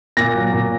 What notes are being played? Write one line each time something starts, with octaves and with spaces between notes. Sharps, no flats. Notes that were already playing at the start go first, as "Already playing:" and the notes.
A#2 A#6
F#3
A#2